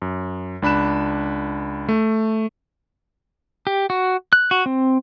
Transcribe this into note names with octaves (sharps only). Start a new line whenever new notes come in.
F#2
C#2 D4 B5 F#6 E7
A3
G4
F#4
F#6
F#4
C4